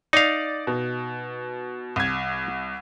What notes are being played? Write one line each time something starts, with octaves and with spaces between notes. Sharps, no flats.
D#4 D5 F5
B2
C2 G#6